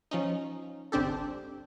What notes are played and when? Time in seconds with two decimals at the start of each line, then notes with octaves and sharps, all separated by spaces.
0.11 F3 C#4 D#4
0.92 G1 C2 C4 D4 G4 A4